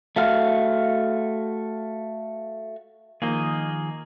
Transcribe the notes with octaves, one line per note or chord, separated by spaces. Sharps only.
A3 F#4 F5
D#3 F3 A#3 G#4 D#5